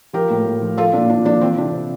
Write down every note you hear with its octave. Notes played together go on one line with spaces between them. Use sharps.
F3 G4 A#4
A2
A2
F3
F3 F4 A4
A#2 D4
A#2 D4
F3 D4
E3 C4
C3 D4
C3